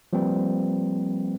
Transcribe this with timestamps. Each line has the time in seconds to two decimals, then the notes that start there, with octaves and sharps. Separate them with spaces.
0.13 F3 G3 A#3 C4 B4